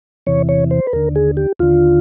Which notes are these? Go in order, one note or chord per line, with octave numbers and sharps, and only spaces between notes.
E2 C3 E3 C#5
C#5
C5
B4
D#2 D3 A#4
G#4
G4
D#2 D3 F4